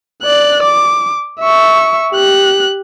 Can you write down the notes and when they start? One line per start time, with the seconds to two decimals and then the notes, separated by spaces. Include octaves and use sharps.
0.23 D5 F#6
0.63 D6
1.40 E5 C#6
2.13 G4 F#6